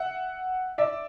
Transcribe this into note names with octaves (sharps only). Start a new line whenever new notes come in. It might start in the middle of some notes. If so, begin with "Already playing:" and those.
Already playing: E5 F#5
D5 E5